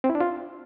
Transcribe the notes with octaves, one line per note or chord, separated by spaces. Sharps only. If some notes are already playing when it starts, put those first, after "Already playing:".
C4
E4
D4
F4